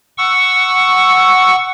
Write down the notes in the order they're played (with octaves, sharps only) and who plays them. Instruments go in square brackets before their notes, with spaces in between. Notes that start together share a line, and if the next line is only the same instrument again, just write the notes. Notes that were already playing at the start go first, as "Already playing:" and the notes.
[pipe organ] F#5 C#6 E6